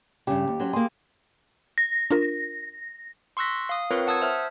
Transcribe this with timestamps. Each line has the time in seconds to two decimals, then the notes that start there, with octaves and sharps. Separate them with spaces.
0.27 G2 C#3 G4
0.48 D#2
0.60 F#3 C#4 C5
0.73 A#3 G#4 C6
1.78 A#6
2.11 D4 F4 A#4
3.37 C6 C#6 E6 F#6 A#6 B6
3.69 F5 D#6
3.91 C4 F4 A#4 B4 C#5
4.07 F#5 A5 D#6 E6 G#6
4.22 C5 E5 A5 F6